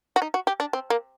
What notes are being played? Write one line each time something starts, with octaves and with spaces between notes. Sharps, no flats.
F#4
D#4
F#4
G4
D4
C4
A#3